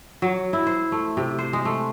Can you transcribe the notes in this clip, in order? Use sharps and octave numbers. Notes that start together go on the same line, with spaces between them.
F#3
E4
C5
A3
C3
C5
G#3
A3